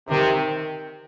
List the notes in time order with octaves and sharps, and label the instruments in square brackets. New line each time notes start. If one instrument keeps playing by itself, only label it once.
[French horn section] C3 [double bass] D#3